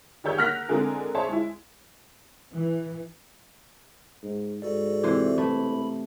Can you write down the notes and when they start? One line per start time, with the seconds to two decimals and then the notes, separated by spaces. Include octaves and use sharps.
0.24 D#3 G4 G#4 C#5 E6 G6
0.37 A#3 F#5 F6 F#6 A#6 B6
0.69 D3 G#3 C4 G#4 A#4
1.15 G#4 C5 C#5 E5 A5
1.29 G#3 E4
2.53 E3
4.23 G#2
4.62 G#2 F#4 A4 D5
5.03 C3 E3 C5
5.38 E1 A3 B5